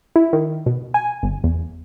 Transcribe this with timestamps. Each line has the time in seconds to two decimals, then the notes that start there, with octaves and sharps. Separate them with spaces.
0.16 E4
0.33 D#3
0.66 B2
0.94 G#5
1.23 G1
1.44 E2